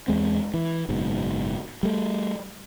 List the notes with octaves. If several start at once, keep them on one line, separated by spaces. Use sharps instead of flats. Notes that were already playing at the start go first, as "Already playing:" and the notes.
E2 G#3 C4
E3
F#1 G#2 B2
G3 A3